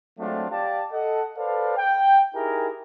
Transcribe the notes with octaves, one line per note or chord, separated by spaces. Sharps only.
F#3 G#3 A3 C4 D4 F4
G4 D5 F5 A5
A4 D#5 F#5
A4 B4 C5 D5 F5
G5
D#4 E4 G4 G#4 A#4